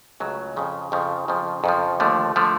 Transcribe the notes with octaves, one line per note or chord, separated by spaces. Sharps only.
C#2 C#3 F#3 A3
F2 C#3 F3
F2 C#3 F3
F2 C#3 F3
F2 C#3 F3
D#2 D3 F3 A3
D3 F3 A3